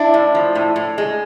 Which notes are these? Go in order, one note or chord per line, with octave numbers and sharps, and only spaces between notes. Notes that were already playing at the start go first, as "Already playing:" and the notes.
Already playing: D4 E4
A2
F3
A2
A2
G#3